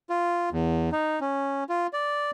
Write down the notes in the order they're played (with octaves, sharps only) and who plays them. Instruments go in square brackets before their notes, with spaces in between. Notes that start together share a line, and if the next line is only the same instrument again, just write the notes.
[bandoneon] F4
E2
D#4
C#4
F4
D5